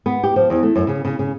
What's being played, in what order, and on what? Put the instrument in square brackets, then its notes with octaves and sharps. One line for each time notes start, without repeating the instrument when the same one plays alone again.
[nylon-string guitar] B3
G4
F3
E2
A3
F#2
C#3
C#3
C#3